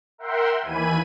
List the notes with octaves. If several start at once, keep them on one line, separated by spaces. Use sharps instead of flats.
A#4 E5 F#5 G5 C6
D#2 E3 G#5 B5 D#7